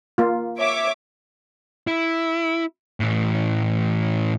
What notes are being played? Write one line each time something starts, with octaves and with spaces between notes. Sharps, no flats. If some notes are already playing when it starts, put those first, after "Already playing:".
A#3 F4
C#5 E5 D6
E4
A2 E3